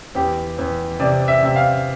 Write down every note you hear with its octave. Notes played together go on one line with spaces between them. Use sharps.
E2 G4
E2
C3 D5
E5
C3 E5
F5